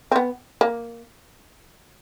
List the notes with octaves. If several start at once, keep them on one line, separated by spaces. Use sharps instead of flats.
C4
B3
A#3